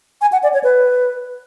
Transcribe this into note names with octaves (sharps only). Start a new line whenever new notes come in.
G#5
F#5
D5
C#5
B4